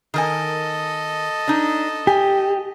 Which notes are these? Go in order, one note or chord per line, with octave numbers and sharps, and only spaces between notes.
D#3 A4 A#4 D#5 G#5
D4 D#4
G4 G#5